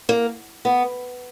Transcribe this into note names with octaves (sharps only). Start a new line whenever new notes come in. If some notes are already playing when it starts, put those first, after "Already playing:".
A#3
B3